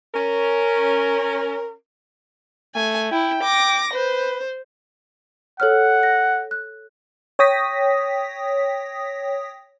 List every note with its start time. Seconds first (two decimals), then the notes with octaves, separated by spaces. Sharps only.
0.14 C#4 A#4
2.75 A3 G#5
3.12 E4 G5
3.43 D6 A#6
3.94 B4 C5
5.60 A4 C#5 F#5 F6
6.03 A#6
6.51 F#6
7.39 C#5 G5 D#6 A#6 B6